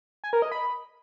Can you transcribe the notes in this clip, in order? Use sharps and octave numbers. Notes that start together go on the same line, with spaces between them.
G#5
A#4
D#5
B5